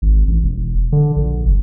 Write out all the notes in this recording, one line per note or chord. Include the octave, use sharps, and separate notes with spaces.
G#1
A1
E1
D3
A#1
F#1